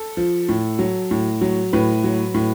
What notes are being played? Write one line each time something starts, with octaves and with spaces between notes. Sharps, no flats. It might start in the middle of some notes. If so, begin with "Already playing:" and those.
Already playing: A4
F3
A2
F#3
A2
F#3
A2 B4
F#3
A2